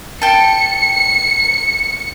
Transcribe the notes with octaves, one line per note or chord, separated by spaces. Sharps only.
G5 A5 C#7